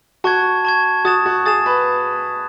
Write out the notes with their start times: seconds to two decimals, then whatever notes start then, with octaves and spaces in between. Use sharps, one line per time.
0.24 F#4 A5 C#6 G#6
0.65 A5 C#6 G#6
1.05 F#4 D#6 A6 E7
1.26 F#4
1.46 G#4 D#6 A6 E7
1.66 B4